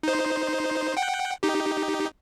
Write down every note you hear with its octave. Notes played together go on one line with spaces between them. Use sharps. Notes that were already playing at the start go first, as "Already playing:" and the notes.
D#4 C5
F#5 G5
D#4 G4